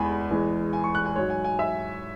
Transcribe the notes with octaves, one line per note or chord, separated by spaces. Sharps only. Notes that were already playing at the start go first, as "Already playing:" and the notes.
Already playing: E2 E3 G#3 G#5 B5
E2 E3 G#3
G#5
C#6
F#6
G#5
G#2 F#3 C#5
G#5
G#5
E5